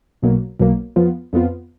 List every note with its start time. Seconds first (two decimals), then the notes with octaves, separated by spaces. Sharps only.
0.22 B1 B2 F#3 A#3
0.60 B1 B2 F#3 A#3
0.96 F2 F3 B3 F4
1.33 F2 F3 B3 F4